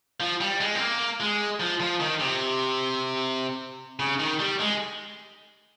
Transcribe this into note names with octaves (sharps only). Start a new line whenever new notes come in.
F3
G3
G#3
C4
A#3
G#3
F3
F3
D#3
C3
C#3
D#3
G3
G#3